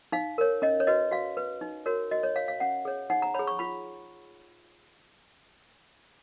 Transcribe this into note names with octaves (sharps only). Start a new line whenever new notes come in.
D#4 F5
A#4 C#5
C#4 D#5
C#5
F#4 B4 D#5
F#4 F5
B4
D#4
F#4 A#4 C#5
F#4 D#5
C#5
C#5 F5
F5
C#4 F#5
G#4 C#5
D#4 F#5
A#5
G#4 C#5 B5
C#6
F4 B5